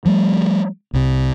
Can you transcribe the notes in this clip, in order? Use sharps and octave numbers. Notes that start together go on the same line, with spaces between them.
F3 G3 A3
C2 C3